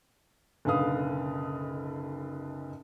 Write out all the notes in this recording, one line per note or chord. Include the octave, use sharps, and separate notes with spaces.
F#1 B1 D3 B4 F5 D#6